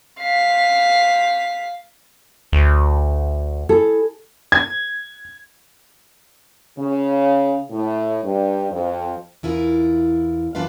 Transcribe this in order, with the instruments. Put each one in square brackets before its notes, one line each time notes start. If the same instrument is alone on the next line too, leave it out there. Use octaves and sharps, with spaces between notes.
[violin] F5 B6
[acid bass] D2
[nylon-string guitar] E4 G#4 A4
[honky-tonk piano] G#6
[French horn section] C#3
A2
G2
F2
[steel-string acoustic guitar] E2 E4 F4 A#4
F#2 E3 D4 F4 B4 F5